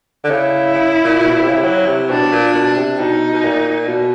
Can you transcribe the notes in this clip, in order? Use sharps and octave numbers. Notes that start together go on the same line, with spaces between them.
D3
C#3 E4
C#3
A#2
A#2
B2
A#2
C3
C#3
C3
F#3
C3
B2 D4
B2
A#2
B2
C3
B2 D#4
B2
A#2
B2